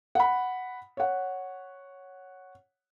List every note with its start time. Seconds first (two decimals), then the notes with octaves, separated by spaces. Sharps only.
0.15 F#5 B5
0.97 C#5 F#5